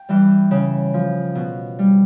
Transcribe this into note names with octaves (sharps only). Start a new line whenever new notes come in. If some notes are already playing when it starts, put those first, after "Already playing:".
Already playing: G5
E3 G3
C#3
F3
B2
G3